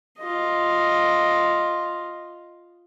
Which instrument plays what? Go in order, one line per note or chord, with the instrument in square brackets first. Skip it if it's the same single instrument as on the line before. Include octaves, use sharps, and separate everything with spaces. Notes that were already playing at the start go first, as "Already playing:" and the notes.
[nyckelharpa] F4 D#5